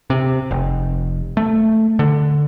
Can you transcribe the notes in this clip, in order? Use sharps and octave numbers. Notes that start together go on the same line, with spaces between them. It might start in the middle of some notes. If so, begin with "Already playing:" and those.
C3
F1
A3
D3